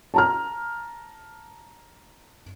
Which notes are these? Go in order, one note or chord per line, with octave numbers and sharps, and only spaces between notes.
A5 A#5 F6